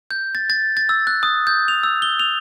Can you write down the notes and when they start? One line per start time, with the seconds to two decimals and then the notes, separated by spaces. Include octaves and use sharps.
0.11 G6
0.35 A6
0.50 A6
0.77 A6
0.89 E6
1.07 F#6
1.23 D#6
1.47 G6
1.68 F7
1.83 E6
2.02 G7
2.19 F7